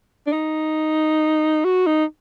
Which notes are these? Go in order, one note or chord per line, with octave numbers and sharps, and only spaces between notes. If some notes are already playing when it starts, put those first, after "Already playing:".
D4
D#4
F#4
D#4